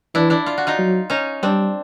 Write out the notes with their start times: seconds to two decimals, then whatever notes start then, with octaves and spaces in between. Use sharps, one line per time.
0.15 E3 D4 E4
0.30 D4 E4
0.46 F4
0.58 F#4
0.67 D#4 F4
0.79 F#3
1.10 C#4 D#4
1.43 G3 C4 D4